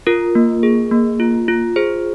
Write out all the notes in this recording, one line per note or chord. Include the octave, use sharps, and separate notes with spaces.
F4 A#4
A#3
G#4
A#3
F4
F4
G#4 C5